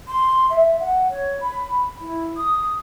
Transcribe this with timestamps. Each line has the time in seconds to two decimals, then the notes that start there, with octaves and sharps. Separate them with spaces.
0.08 C6
0.50 E5
0.80 F#5
1.10 C#5
1.41 B5
2.01 E4
2.37 D#6